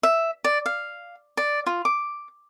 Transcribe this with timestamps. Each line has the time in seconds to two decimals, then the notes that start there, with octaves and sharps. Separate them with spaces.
0.03 E5
0.44 D5
0.66 F5
1.37 D5
1.66 F4
1.85 D6